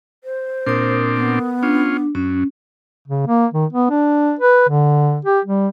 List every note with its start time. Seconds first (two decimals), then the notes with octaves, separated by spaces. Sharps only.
0.24 C5
0.67 A#2 C4 D4 A#4 D#6
1.16 B3
1.63 C#4 D4 F4
2.15 F#2 C#4
3.08 C#3
3.27 A#3
3.54 D#3
3.73 B3
3.90 D4
4.39 B4
4.69 D3
5.25 G4
5.45 G3